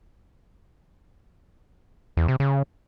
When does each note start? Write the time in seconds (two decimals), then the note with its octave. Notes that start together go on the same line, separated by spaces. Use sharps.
2.17 E2
2.28 C3
2.40 C#3